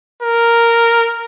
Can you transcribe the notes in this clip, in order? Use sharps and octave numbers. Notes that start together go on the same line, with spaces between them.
A#4